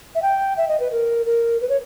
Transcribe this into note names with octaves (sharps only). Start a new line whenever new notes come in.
E5
G5
E5
D#5
B4
A#4
A#4
B4
C#5